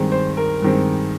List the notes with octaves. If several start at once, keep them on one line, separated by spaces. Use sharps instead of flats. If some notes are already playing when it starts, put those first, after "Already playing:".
Already playing: G2 D#3 G#3 C4
C5
A#4
G2 D#3 G#3 C4